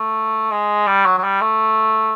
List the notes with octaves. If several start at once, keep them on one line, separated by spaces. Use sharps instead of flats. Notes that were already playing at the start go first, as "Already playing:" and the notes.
Already playing: A3
G#3
G3
F#3
F#3
G3
A3